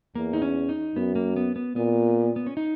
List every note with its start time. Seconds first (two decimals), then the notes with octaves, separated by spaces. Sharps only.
0.15 E2 A#3
0.33 D#4
0.42 C#4
0.69 D#4
0.96 F#2 B3
1.16 A#3
1.36 B3
1.56 B3
1.76 A#2 B3
2.36 B3
2.47 C#4
2.57 D#4